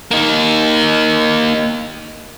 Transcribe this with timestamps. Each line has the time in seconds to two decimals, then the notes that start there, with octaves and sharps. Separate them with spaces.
0.11 A#3 D#4